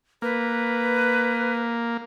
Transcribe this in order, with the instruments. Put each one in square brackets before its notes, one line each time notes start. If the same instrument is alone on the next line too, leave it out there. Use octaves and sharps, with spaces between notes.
[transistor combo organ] A#3 [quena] B4